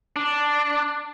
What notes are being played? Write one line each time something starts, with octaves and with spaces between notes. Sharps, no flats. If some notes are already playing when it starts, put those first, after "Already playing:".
D4